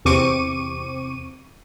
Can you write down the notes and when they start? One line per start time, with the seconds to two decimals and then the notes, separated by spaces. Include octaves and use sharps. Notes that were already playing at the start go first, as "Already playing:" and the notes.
0.05 E2 C3 C4 C#6 D6 D#7